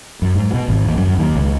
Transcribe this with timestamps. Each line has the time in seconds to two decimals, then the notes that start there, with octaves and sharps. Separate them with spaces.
0.22 F#2
0.35 G#2
0.54 B2
0.68 G#1
0.85 D#2
0.97 F#2
1.18 D#2
1.35 C#2